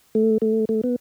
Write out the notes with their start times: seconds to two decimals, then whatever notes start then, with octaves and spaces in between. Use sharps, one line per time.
0.15 A3
0.42 A3
0.69 A3
0.84 B3